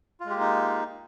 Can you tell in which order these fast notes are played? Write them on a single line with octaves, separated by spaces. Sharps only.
F4 G#3 G4 A#3 D#4